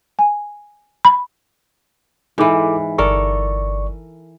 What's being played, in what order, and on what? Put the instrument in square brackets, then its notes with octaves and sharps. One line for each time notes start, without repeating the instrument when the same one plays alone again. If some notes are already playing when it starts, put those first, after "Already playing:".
[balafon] G#5
B5
[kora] G#2 E3 [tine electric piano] E4 A4 D6
[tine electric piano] G1 D5 C#6 [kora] A4 A#4